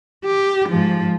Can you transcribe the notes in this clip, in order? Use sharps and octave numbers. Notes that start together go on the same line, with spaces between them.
G4
G#2 F3